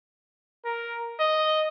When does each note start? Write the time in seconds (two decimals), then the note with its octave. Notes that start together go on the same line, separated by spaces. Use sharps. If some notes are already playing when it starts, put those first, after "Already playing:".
0.65 A#4
1.20 D#5